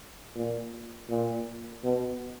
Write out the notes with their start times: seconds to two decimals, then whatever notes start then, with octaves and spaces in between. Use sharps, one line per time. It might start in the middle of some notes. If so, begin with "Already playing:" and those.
0.35 A#2
1.09 A#2
1.84 B2